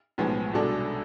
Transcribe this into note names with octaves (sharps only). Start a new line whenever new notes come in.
B1 A2 F3 G#3 B3
C2 B2 G#3 D4 A4